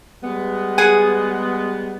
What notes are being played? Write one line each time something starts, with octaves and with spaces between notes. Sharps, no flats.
G3 G#3 B3
G#4 F#5 G#5